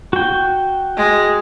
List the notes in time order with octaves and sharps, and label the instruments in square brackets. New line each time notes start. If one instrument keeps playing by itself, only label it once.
[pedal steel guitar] F#4 G5
[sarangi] G#3